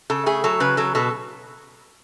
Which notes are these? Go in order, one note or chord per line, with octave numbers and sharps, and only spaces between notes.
C#3 A4
A3 G#4
F#3 A4
C#3 B4
F#3 A4
B2 A4